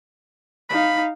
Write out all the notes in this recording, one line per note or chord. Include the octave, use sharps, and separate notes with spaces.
D#4 F5 B5